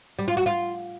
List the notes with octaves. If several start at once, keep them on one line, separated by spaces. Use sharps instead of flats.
G3
F4
F#4
F4